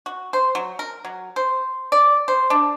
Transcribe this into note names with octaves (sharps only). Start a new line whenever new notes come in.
F#4
C5
F#3
A#4
F#3
C5
D5
C5
D4